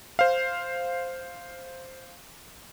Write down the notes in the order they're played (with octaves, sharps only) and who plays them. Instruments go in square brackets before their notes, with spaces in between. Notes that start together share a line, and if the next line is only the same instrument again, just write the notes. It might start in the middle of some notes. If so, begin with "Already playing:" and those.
[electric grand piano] C5 F5